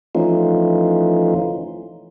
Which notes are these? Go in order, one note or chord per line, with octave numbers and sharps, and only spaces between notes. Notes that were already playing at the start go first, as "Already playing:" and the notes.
E3 F3 A3 C#4 D#4 F4